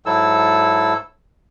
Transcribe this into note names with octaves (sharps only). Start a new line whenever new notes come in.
G#2 F#3 E4 A4 E6